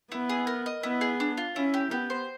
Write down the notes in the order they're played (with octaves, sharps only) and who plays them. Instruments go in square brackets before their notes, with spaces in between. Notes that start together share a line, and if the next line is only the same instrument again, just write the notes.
[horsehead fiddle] B3 [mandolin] E4
[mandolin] G#4
A#4
D#5
[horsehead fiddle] B3 [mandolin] E4
[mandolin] G#4
D4
F4
[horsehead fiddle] C#4 [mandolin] E4
[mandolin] G4
[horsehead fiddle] B3 [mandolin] G4
[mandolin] C5